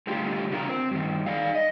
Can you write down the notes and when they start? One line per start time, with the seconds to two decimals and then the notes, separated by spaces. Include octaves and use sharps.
0.07 A2 D3 G3 F4 G4
0.50 C#3 D4 F4 A#4
0.69 C4
0.91 G2 D#3
1.26 D#4 D5 F5
1.55 D#5